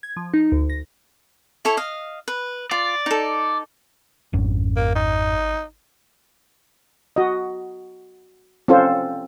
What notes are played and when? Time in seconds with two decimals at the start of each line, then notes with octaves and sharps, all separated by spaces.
0.03 G#6
0.17 F3
0.34 D#4
0.52 D2
0.70 A#6
1.65 E4 A4 C#5
1.77 D#5 F5
2.28 B4
2.71 F4 D5
3.06 D#4 A4
4.33 G#1 F2 G#2 C#4
4.76 A#3
4.95 D#4
7.16 F#4 D#5
8.68 C4 C#4 F4 A4 C5